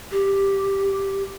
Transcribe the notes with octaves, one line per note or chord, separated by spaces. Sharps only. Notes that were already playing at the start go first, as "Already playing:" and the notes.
G4